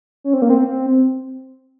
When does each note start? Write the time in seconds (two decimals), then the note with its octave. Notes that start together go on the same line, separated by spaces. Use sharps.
0.24 C#4
0.34 C4
0.42 A#3
0.50 C4